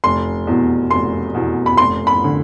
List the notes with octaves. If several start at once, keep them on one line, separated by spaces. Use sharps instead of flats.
F1 C6
E2 B2
F1 C6
E2 B2
B5
F1 C6
B5
D3